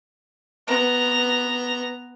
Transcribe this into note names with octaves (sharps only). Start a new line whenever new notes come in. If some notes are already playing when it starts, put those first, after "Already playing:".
B3 A#5